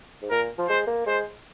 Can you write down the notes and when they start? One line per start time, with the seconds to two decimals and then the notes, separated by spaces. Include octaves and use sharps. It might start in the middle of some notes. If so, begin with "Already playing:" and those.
0.22 G#2
0.30 A#2 A#4
0.58 F3
0.68 G#3 C5
0.87 A#3
1.06 G#3 C5